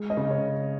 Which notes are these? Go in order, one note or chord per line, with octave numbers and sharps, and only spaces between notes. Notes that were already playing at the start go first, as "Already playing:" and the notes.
Already playing: G#3
D#5
C#3
C#5